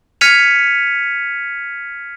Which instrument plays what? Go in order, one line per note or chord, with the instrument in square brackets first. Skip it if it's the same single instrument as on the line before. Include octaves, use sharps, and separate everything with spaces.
[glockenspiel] F6 G#6 B6 C#7 D#7 F7